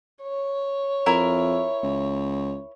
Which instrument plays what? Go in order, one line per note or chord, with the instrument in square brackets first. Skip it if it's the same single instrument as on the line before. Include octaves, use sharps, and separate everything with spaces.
[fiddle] C#5
[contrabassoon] F2 [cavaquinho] E4 A#4 E5
[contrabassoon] C#2